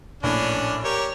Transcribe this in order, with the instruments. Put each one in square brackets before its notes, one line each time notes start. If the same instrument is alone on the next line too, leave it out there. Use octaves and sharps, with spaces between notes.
[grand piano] A#1 A2 [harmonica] C#4 D4
[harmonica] G4 A#4 C#5